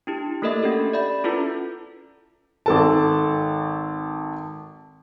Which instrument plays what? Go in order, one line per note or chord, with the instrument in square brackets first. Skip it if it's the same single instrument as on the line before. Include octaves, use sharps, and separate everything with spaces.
[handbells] D4 E4 G4
A3 A#3 A4 A#4 D#5 E5
C#4 D4 F#4 G4 A4
D5 E5 B5
C#4 E4 F4 A4 B4
[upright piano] G#1 A4 A5